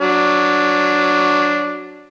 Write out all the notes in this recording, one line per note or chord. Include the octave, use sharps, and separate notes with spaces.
F#3 D4